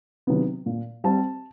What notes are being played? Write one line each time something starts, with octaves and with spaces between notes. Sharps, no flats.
C3 D#3 F#3 B3
A#2
G3 C4 A5